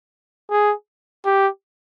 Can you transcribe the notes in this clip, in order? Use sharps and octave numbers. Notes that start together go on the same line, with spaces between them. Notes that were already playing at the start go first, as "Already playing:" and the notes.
G#4
G4